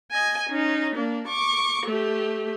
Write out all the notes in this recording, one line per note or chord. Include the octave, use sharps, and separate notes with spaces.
D#5 G#5
C#4 D#4
A#3 D4
C#6 D6
A3 G4